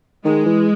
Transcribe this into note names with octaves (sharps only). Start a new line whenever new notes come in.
D#3 G#3
E3